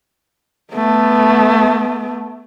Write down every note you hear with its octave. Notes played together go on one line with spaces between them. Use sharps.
A3 B3